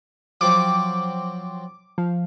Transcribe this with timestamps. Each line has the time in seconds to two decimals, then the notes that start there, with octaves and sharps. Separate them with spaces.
0.41 F3 F#3 C4 D6
1.98 F3